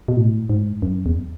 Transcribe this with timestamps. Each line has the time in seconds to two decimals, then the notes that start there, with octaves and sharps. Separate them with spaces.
0.08 B2
0.17 A2
0.50 G#2
0.82 F#2
1.06 E2